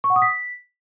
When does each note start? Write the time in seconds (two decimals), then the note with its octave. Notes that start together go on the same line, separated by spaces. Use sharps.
0.04 C#6
0.10 F#5
0.16 D#6
0.22 B6